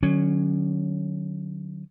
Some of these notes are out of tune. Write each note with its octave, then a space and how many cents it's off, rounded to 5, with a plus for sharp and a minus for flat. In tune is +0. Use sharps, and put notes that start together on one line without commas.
D3 +40 F#3 +0 C#4 +0